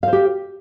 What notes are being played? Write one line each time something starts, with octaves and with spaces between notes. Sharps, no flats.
G4 C5 F5